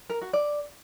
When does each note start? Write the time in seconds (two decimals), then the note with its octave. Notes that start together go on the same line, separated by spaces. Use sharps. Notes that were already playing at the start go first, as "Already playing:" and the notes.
0.10 A#4
0.21 F#4
0.33 D5